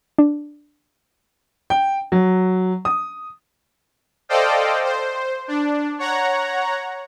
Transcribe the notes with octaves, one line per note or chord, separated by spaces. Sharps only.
D4
G5
F#3
D#6
A4 C5 D5 D#5 F5 G5
C5
D4
C#5 F#5 A#5